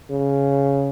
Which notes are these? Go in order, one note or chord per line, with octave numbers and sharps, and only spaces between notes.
C#3